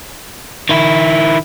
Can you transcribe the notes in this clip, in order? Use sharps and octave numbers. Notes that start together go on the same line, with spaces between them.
D#3 E4